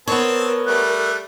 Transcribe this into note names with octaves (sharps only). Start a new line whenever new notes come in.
B3 C4 A#4 C#5 A5
G3 A3 F#6